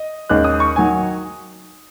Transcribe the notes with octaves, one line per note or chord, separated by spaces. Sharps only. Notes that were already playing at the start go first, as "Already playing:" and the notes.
Already playing: D#5
D#2 D#3 G#3 C#4 F#6
D#6
C#6
D#3 F#3 G#5